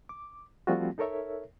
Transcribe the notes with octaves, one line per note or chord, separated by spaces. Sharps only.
D6
F3 G3 A3 C4 F4 F#4
D#4 A4 A#4 C#5 E5